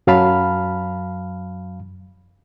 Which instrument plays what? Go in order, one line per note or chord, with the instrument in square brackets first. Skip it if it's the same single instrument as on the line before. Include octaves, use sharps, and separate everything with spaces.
[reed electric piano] F#2 F#3 F5 A5 B5 F6